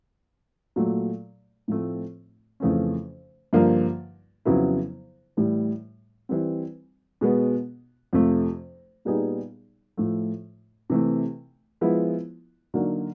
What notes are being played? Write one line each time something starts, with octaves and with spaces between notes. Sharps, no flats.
A#2 F#3 A3
A2 F3 A3 C4
F2 C#3 E3 A3 C#4
G2 D3 F3 A#3
F2 C#3 F#3 B3 E4
A2 E3 G3
E3 G3 C4
B2 G#3 B3
F2 C3 F3 A3
A#2 G3 B3 D#4 G#4
A2 F3 A3
C3 E3 A3
F3 G#3 B3 E4
D3 F#3 A#3 D#4 F#4